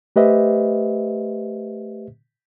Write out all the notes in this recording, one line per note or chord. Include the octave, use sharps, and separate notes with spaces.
A3 G4 B4 C5 D#5 E5